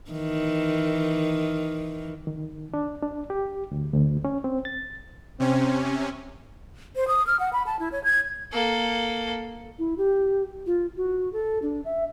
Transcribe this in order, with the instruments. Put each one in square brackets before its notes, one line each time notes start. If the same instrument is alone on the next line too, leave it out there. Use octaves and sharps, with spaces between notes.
[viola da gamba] D#3 E3
[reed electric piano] D#3
D4
D4
G4
D2
D2
C#4
C4
A6
[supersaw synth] C3 C#4 [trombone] C4
[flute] C5
D#6
F6
F#5
B5
A5
E4
C#5
G#6
[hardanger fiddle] A#3 A4
[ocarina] E4
G4
F4
F#4
A4
D4
E5